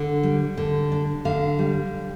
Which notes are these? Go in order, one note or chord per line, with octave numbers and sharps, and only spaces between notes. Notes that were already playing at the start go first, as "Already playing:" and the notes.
Already playing: D3
G3
D3
D4
D3 F5
G3